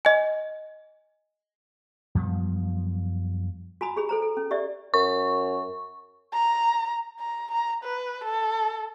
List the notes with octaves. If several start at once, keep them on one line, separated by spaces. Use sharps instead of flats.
D#5 G#5
F#2 F3 G3 B3
F#4 G#5 A#5 B5 D#6
G4 G#4 B5
A4 C5 A#5
A4
C#4
G4 D5 E5
F#2 C#6
A#5
A#5
A#5
B4
A4